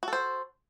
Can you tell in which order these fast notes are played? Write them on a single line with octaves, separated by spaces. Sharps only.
F#4 A4 C5